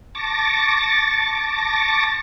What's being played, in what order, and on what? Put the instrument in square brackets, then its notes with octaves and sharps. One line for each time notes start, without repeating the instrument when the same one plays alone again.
[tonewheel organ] A5 C#6 D6 A6 A#6